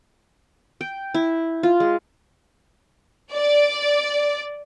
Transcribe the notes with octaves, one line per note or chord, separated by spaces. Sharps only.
G5
E4
F4
G#3
D5